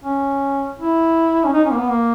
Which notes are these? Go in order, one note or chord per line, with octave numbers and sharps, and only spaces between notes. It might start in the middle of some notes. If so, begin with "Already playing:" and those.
C#4
E4
C#4
D#4
C#4
A#3
B3
A#3